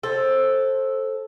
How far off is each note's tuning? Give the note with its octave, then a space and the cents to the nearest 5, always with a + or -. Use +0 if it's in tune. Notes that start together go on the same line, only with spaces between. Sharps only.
A4 +0 C5 +20